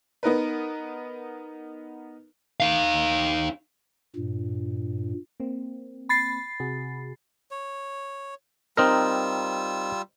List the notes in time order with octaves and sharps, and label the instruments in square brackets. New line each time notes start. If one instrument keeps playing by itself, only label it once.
[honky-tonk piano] B3 D#4 A#4 B4
[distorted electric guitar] D#4 F5
[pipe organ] G2 A#2
[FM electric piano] A#3 C4
[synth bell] B5 A6 C7
[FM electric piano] C3 F#4 G#4
[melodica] C#5
[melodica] G3 F4 E6 [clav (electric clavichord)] C4 D#4 A#4